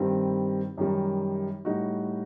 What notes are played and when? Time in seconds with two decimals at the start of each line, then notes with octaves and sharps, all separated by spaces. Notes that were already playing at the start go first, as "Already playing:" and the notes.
Already playing: G2 D#3 G3 C4
0.78 F#2 D#3 G3
1.65 A2 G3 D#4 F#4